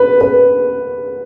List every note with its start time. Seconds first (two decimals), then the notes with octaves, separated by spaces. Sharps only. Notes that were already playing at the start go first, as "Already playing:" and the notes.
Already playing: B4
0.21 B4